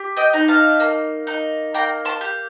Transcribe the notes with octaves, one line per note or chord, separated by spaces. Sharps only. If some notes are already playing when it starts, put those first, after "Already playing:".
Already playing: G4
D#5 G5
D#4
F5 A5
A#3
D#4
A#3 G5 A#5
A5 C6
G4